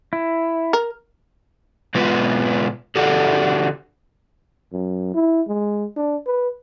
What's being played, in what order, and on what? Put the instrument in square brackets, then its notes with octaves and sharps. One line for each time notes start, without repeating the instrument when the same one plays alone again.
[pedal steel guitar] E4
[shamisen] A#4
[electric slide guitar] B2 G#3 B3 F4 B4
D3 D4 F#4 G4 A4
[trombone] F#2
E4
G#3
D4
B4